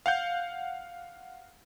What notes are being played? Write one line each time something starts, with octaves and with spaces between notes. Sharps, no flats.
F5 F#5 G6